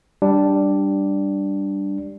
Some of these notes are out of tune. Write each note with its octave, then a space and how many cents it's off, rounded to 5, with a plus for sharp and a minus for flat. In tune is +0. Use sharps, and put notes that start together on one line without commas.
G3 +0 D4 +0